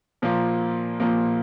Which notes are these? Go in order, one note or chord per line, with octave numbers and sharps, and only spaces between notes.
A#2 F3 A#3
A#2 F3 A#3